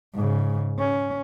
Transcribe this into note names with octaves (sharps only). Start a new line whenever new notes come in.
G#2 C#3
C#4